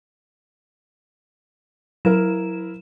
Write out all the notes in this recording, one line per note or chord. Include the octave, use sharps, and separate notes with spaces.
F#3 E4 A#4 E7